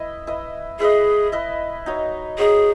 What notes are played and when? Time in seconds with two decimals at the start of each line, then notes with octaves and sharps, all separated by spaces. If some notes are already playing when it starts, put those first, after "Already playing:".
Already playing: E4 B4 D#5
0.27 E4 B4 D#5
0.80 E4 G#4 B4 D#5
1.32 E4 B4 D#5
1.86 D#4 F#4 C#5
2.38 D#4 F#4 G#4 C#5